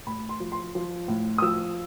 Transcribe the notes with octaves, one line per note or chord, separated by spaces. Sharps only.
A2 B5
C6
F3
C6
F3
A2
D#6
F3 E6